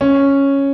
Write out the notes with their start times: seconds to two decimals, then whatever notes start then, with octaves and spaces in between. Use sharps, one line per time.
0.01 C#4